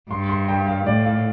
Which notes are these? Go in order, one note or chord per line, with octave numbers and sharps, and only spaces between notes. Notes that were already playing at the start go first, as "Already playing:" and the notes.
G2 C6
C6
G5
F5
A2 D5
F5